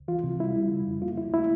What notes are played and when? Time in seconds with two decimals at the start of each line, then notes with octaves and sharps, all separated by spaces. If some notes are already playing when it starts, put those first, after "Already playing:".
Already playing: C#2
0.08 E3 F4
0.24 C3
0.40 G3 E4
0.56 G3
0.71 C#3
0.87 F2
1.02 A#3 F4
1.17 D#2 E4
1.33 A3 E4